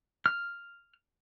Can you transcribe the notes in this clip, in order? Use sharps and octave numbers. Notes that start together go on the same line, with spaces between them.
F6